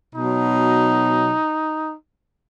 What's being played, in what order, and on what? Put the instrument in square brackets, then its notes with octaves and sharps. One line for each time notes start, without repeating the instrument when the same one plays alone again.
[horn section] B2 F#3 D#4